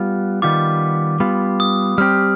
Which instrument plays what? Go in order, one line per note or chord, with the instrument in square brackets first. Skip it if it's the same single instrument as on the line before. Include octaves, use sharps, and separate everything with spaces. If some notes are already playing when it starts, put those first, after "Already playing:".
Already playing: [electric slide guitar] G3 B3 F4
[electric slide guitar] D#3 G3 B3 F4 [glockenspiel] D6
[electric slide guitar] G3 B3 F4
[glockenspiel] D#6
[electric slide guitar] G3 C4 G4 [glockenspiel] F6